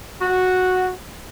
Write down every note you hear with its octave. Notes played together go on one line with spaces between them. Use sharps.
F#4